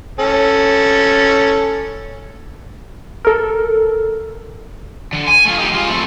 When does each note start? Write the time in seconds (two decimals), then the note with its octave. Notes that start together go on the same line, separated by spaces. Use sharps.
0.19 C#4 A4
3.25 A4 A#4
5.13 D3
5.28 G#5
5.45 A3 F4
5.58 D#4 G4
5.72 G#3 F4
5.89 A3 C4